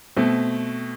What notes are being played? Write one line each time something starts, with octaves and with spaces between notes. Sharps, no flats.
B2 A3 C4